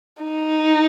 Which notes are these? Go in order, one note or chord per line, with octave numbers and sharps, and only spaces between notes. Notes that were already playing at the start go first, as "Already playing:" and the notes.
D#4